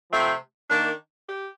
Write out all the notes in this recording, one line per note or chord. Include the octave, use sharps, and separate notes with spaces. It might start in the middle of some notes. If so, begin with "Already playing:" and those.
C3 F3 A3 C4
D#3 A#3 D4
G4